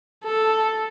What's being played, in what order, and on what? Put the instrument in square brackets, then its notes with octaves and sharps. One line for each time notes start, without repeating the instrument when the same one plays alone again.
[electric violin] A4